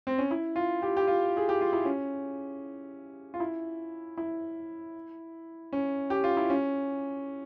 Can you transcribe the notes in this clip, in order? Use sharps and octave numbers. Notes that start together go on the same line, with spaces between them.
C4
C#4
E4
F4
G4
G4
F4
G#4
G4
F4
E4
C#4
F4
E4
E4
C#4
G4
F4
E4
C#4